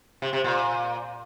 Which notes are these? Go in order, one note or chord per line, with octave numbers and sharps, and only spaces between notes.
C3
C3
A#2